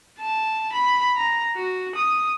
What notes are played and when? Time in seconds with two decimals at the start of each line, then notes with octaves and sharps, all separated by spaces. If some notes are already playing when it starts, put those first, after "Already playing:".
0.20 A5
0.73 B5
1.16 A#5
1.56 F#4
1.96 D#6